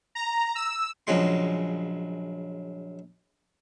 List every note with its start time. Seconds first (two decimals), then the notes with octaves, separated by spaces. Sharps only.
0.15 A#5
0.55 E6
1.07 A#1 C#3 F#3 G#3 C6